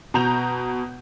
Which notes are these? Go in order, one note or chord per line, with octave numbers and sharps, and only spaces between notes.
B2 A#5 G6 F7